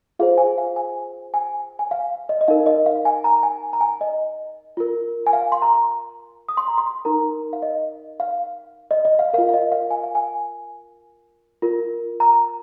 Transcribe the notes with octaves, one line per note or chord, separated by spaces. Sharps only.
F4 G#4 C5 F5
G#5
F5
G#5
G#5
G#5
F5
D#5
D#5
D#4 A#4 F5
D#5
F5
G#5
A#5
G#5
A#5
G#5
D#5
F4 A#4
G#5
F5
C6
A#5
D#6
C6
A#5
C6
D#4 A#4 A#5
F5
D#5
F5
D#5
D#5
F5
F4 A#4 F5
F5
D#5
F5
G#5
F5
G#5
F4 A#4
A#5